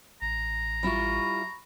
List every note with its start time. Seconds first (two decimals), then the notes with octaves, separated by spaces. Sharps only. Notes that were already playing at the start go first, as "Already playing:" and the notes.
0.22 A1 A#5
0.83 G3 E4 F4 B5 C#6